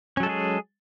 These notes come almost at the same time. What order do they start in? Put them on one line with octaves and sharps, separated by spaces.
C#4 F#3 A4 G#3 G#4